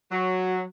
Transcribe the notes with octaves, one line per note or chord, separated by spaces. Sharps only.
F#3